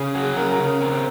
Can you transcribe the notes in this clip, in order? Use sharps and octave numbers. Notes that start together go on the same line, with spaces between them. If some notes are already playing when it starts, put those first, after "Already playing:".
Already playing: C#3 G#4
F#3 G#4
C#3 A#4
A#4
C#3
A#4
C4 A#4